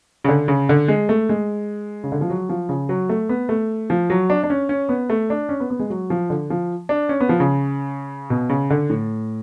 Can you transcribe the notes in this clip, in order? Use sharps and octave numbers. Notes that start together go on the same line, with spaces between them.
C#3
D3
C#3
D3
G#3
A3
G#3
C#3
D3
F3
F#3
F3
C#3
F#3
A3
B3
A3
F3
F#3
D4
D4
C#4
C#4
B3
A3
D4
C#4
B3
B3
G#3
F#3
F3
D3
F3
D4
C#4
B3
F3
C#3
B2
C#3
D3
A2